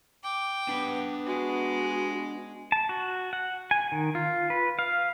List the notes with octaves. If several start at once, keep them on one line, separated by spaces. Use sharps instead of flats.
G5 D6
B3 D4 B5
G#3 F#4
A5
F#4
F#5
G#5
D#3
F4
B4
F5